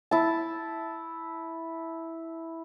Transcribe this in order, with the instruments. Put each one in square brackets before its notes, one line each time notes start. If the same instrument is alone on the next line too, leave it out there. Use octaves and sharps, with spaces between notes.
[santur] E4 A5